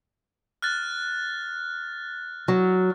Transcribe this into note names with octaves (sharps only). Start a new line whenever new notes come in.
F6 F#6 A6
F#3